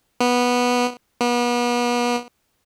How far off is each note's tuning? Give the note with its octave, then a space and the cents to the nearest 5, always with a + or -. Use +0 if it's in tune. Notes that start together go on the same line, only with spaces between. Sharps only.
B3 -10
B3 -35